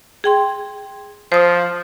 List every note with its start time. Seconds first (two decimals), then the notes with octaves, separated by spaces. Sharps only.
0.24 G#4 G5 C6
1.32 F3 C5 D#6